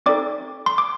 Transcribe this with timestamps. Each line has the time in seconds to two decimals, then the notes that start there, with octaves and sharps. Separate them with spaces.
0.06 C4 D#4 A4 D5 D6
0.66 C6
0.78 D6